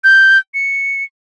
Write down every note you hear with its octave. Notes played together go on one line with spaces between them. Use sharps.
G6
C#7